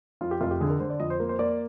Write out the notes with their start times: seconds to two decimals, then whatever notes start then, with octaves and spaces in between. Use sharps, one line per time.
0.21 F2 F4
0.31 G4
0.41 F1 F4
0.51 G4
0.60 D3 G#4
0.70 A#4
0.80 D3 C5
0.90 D5
1.00 F2 D#5
1.10 C5
1.20 A#3
1.29 C5
1.39 A#3 D5